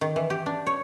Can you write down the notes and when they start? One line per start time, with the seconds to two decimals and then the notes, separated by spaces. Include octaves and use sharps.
0.01 D#3
0.16 E3
0.30 G4
0.46 D4
0.67 C#5